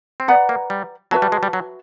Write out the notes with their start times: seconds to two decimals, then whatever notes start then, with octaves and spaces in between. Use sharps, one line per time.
0.20 C4
0.28 B3 B4 D5 F#5 A#5
0.49 A#3
0.70 G3
1.11 F#3 F#4 B4 E5 A5
1.22 G3
1.32 G#3
1.43 G3
1.53 F#3